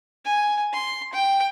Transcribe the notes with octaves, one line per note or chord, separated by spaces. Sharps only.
G#5
C6
G5